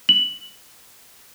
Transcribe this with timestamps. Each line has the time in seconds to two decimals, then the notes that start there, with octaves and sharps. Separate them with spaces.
0.09 F#7